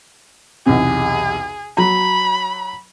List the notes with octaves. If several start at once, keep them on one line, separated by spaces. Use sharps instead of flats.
B1 E2 C3 G#4
F#3 A#5 B5